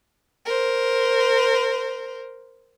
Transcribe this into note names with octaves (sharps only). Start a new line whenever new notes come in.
A#4 C5